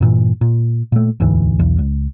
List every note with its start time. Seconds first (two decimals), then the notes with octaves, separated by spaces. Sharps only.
0.01 G2 A#2 E3
0.41 A#2
0.92 A#2 A3
1.20 E1 D2 G#2 E3
1.59 B1 E2
1.78 C#2